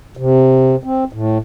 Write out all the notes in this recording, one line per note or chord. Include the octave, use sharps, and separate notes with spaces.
C3
C4
A2